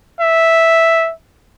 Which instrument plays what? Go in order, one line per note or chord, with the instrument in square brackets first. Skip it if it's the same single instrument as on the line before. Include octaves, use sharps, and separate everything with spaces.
[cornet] E5